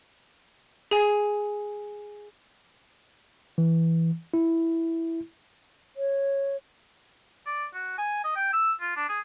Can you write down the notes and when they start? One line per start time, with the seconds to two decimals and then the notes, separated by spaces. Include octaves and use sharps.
0.91 G#4 G#5
3.58 E3
4.34 E4
5.97 C#5
7.46 D5
7.74 F#4
7.98 G#5
8.24 D#5
8.36 G5
8.53 E6
8.81 F4
8.96 D4
9.09 G#4